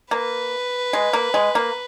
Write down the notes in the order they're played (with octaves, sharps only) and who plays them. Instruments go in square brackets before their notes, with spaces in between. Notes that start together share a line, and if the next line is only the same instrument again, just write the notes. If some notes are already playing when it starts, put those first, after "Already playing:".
[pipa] A#3 [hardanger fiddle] B4
[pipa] G#3
A#3
G#3
A#3